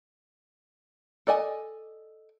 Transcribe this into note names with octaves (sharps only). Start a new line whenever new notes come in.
A4 D5 D#5 G#5